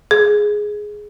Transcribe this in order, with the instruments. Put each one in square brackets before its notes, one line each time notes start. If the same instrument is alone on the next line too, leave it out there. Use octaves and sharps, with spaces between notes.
[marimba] G#4